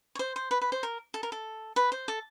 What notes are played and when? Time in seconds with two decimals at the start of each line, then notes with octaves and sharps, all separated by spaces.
0.15 C#5
0.19 C5
0.36 C5
0.51 B4
0.61 B4
0.72 C5
0.83 A#4
1.14 A4
1.23 A#4
1.32 A4
1.76 B4
1.92 C5
2.08 A4